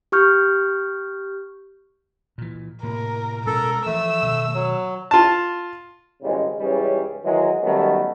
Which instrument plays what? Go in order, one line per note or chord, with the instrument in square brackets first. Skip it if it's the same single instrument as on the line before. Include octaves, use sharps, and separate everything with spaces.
[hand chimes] G4 C#6 F6 G6
[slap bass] A#2 E3
[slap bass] A2 C3 A#3 [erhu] A#4
[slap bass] B2 G#3 C#4 [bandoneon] A4 [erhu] A#4
[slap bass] E3 F3 [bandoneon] A3 [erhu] E6
[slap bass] B2 D#3
[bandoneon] F#3
[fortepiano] F4 A5
[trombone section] G#1 A2 C#3 G3 G#3 C#4
C#2 G#2 E3 G3 C#4 G#4
D#3 E3 F#3 G#3
D#3 F#3 G3 A3 B3 C#4